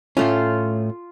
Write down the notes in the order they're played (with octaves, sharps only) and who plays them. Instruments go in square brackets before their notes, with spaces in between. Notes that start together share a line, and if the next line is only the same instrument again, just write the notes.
[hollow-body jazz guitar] A2 A3 C#4 [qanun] F4